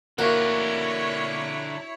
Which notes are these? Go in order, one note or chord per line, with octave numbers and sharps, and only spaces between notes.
D3 A#3 E4 F#4 A#4 C#5